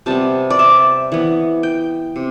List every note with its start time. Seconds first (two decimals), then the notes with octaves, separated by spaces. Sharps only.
0.06 C3 G3 B3 A5
0.50 D5
0.59 E5
1.12 E3 B3
1.63 G5
2.16 C3